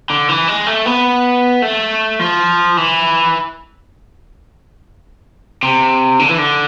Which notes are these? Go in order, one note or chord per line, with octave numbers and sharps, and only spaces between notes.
D3
E3
G#3
A3
B3
A3
F3
E3
C3
D3
E3
D3